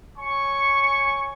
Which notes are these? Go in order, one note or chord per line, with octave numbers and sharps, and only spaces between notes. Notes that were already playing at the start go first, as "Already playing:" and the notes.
C#5 G#5 C#6